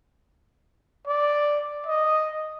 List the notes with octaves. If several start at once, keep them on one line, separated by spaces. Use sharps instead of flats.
D5
D#5